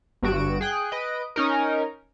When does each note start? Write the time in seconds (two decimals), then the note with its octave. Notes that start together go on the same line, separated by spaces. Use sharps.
0.22 G1 G2 F#4 D7 E7
0.61 G#4 G5 F#6
0.91 B4 D#5 D7
1.36 C#4 D#4 A#4